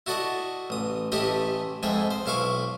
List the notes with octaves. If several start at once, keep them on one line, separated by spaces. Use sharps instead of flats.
E4 F#4 A4 D5 D#5
A1 D#6
A1 A3 E4 G4 D#5 B5
F2 G#2 G#4 E5 G5
C5
B1 E4 F5 C#6 D6